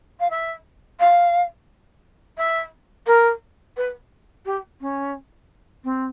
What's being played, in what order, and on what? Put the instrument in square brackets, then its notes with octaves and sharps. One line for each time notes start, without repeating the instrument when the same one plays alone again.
[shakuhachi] F5
E5
F5
E5
A#4
B4
G4
C#4
C4